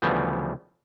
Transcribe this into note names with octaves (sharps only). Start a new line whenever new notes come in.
D2 C#3 E3 F3 G3 B3